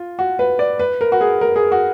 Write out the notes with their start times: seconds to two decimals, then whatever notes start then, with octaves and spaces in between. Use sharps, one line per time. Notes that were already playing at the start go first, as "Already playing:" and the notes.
Already playing: F4
0.19 F#4
0.39 B4
0.59 D5
0.79 B4
1.01 A#4
1.12 F#4
1.21 G#4
1.41 A#4
1.56 G#4
1.72 F#4